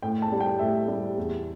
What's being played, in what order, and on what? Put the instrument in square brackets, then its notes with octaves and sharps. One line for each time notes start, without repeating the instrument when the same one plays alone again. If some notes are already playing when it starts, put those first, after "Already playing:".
[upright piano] A2 G5
A5
G3
G5
A2 E5
G3
E2